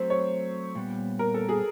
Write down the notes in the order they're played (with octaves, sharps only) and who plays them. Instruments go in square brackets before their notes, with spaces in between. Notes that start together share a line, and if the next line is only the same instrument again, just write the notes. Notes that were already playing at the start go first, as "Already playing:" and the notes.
Already playing: [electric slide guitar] F#3 A3 C4 [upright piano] C5
[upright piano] C#5
[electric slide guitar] A#2 G3 B3
[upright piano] A#4
A4
G#4